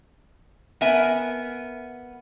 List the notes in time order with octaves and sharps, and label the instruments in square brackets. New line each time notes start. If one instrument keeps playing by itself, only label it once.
[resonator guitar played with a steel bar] B3 A#4 E5 G#5